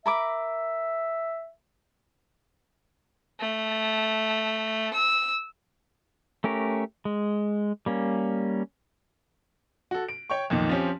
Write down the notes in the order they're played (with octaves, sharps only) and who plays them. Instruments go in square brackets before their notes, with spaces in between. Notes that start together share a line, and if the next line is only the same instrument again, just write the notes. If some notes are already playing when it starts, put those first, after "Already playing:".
[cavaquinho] A#4 B5 D6 [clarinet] E5
[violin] A3
E6
[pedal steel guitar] A3 C#4 G4 A#4
G#3
G3 A#3 C#4
[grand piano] F#4 A4
D7
C#5 G5 C#6
B1 F2 A#2 D#3
F3 C4 C#4 G4